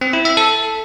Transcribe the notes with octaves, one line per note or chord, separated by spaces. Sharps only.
C4
E4
E5
A4